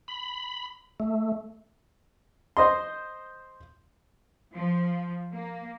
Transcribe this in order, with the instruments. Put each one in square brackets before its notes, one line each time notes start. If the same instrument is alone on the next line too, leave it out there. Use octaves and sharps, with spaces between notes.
[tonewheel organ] B5
A3
[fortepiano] C5 D#5 C6
[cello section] F3
A#3